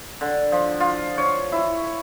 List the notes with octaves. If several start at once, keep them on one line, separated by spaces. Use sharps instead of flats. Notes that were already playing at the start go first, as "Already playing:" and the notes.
D3
F3
F4
C#5
E4